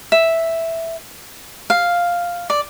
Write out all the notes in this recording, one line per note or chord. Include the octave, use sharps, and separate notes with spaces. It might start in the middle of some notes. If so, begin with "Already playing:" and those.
E5
F5
D5